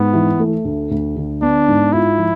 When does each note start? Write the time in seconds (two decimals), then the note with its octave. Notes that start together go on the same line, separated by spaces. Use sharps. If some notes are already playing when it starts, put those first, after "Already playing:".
Already playing: G#2 B3
0.14 E3
0.39 A3
0.65 D2
0.91 D2
1.16 D3
1.42 B3 D4
1.68 G#2
1.93 E4 F4
2.18 F3